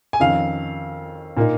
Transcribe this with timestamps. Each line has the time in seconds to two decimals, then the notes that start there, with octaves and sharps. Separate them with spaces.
0.13 G#5
0.20 F2 D#3 C#4 F5
1.37 A#2 A#3 D#4